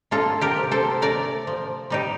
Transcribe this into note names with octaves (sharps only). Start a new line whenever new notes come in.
A#3 F4 A4
G4 A#4
C3
A4 C5
A3 A#4 D5
F3
G3 D#4 G4